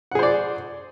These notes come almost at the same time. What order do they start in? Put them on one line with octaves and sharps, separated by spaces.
F#5 G#4 C5 D5